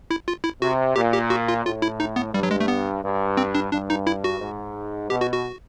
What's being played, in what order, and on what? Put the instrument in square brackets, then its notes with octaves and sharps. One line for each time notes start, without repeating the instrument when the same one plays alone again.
[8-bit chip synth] E4
F4
E4
[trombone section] C3 [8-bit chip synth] F#4
[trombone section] A#2 [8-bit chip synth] G4
[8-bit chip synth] G4
F#4
F4
[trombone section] A2 [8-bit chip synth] F4
[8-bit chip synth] E4
D#4
B3
[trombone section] G2 [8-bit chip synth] G3
[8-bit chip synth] F#3
G#3
A3
B3
[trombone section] G2
[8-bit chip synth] C4
D4
[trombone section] G2 [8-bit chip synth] D4
[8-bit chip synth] D#4
E4
F#4
[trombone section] G#2
[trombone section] B2 [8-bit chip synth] G4
[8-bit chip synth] F#4
F#4